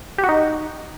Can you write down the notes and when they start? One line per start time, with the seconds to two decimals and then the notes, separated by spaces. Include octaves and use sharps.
0.18 G4
0.24 F#4
0.29 D#4